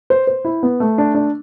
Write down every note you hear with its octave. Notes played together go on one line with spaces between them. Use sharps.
C5
C5
E4
B3
A3
D4
D4